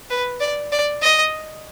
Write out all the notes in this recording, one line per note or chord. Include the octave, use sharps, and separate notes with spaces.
B4
D5
D5
D#5